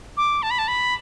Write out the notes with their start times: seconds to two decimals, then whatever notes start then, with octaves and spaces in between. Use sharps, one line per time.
0.17 D6
0.43 A5
0.51 B5
0.59 A5
0.68 B5